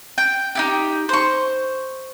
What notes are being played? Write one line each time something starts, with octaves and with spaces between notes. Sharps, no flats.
G5
D#4 E4 G4
C5 C#6